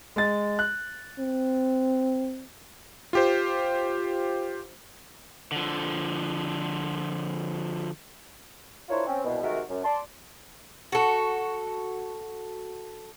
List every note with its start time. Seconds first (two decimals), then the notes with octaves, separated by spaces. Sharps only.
0.16 G#3 A6
0.59 F#6
1.19 C4
3.13 F4 G4 C5
5.52 D3 F3
8.89 D4 E4 F4 A#4 C5 C#5
9.06 C4 C#4
9.24 C2 B2
9.42 C3 D#3 G#3 A3 F#4 A#4
9.69 F#2
9.84 D5 A5 C6
10.92 F#4 A4